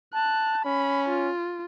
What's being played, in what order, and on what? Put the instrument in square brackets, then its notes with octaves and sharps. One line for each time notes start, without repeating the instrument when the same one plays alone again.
[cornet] A5 [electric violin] F#6
[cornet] C#4 [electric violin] B5
[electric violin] F4